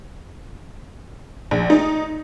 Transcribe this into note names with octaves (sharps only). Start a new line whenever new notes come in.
A#1
D#4